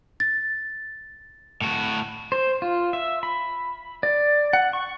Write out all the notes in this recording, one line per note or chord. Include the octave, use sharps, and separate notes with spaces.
A6
A2 F#4
C5
F4
E5
B5
D5
F#5
C#6